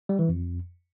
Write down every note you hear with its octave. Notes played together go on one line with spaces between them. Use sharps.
G3
E3
F2